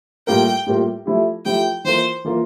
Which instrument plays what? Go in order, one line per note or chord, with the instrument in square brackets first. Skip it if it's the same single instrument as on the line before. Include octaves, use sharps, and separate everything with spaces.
[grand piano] A2 G3 A#3 F4 A#4 [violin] G5
[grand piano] A2 G3 A#3 F4 A#4
F3 A3 E4 G4
[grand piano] F3 A3 E4 G4 [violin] G5
[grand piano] E3 A#3 F4 A#4 [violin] C5
[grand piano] E3 A#3 F4 A#4